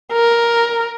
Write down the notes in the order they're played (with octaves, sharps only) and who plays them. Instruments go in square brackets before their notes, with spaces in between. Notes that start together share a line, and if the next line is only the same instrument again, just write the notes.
[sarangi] A#4